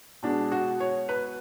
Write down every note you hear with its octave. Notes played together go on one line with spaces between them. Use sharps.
B2 G#3 D4
F#4
C#5
B4